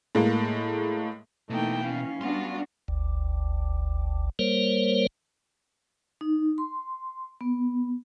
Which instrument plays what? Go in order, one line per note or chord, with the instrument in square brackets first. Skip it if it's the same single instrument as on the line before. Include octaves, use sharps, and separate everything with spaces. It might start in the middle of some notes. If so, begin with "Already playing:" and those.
[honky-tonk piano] A2 G#3 A#3
[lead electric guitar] B2 [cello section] E3 [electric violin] A3 G5 [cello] A#3 D#4
[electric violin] C#4 [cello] F5
[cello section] G3 D4 F#4 [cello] B3 [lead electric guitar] F5 C6
[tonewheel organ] G1 D2
G3 A#3 A#4 C5 C#5
[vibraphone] D#4
C6
B3